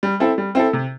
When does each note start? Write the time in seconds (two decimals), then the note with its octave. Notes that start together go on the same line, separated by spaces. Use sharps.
0.03 G3
0.20 C4 E4 A4
0.38 G3
0.55 C4 E4 A4
0.73 C3